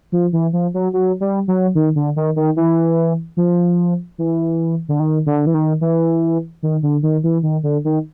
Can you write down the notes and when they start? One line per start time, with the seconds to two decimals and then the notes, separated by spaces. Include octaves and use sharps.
0.12 F3
0.33 E3
0.53 F3
0.74 F#3
0.93 F#3
1.20 G3
1.48 F#3
1.75 D#3
1.96 D3
2.16 D#3
2.36 D#3
2.56 E3
3.37 F3
4.18 E3
4.89 D3
5.00 D#3
5.26 D3
5.47 E3
5.54 D#3
5.81 E3
6.63 D#3
6.83 D3
7.03 D#3
7.24 E3
7.43 D#3
7.63 D3
7.85 D#3